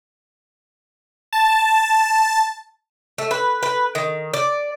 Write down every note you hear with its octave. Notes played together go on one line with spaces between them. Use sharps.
A5
A3
B4
B4
D#3
D5